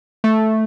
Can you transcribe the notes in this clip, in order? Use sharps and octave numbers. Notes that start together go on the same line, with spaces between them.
A3